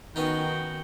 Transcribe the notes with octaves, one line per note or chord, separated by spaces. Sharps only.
D#3 B3 C#4 D#4 F#4 G5